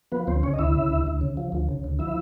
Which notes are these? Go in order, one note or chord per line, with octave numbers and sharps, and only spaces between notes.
F3 B3 B4
D2 C4 C5
C#3 C#4 C#5
D#5
D2 E4 E5
C#3
D2
D2
C#3
F3
D2
C#3
D2
F3 E4 E5